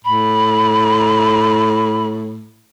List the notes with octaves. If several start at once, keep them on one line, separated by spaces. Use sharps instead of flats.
A2 B5